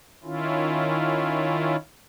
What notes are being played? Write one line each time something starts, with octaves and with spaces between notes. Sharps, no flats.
D#3 C#4 E4 F4